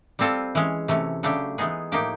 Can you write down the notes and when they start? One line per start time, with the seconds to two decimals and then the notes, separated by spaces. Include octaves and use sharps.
0.19 G3 C4 F4 A4
0.55 E3 G#3 C#4
0.88 C3 E3 A3 C#4
1.23 C#3 F#3 A3 D4 G4
1.58 E3 G#3 B3 D#4 G#4
1.92 A2 F3 A#3 D#4 G4